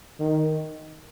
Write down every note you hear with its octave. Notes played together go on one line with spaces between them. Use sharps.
D#3